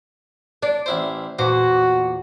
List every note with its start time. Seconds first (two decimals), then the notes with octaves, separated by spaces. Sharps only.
0.63 D4 D5
0.86 A1 E4 C5
1.39 E2 A#2 F#4 C5